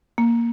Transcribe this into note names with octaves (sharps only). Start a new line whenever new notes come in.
A#3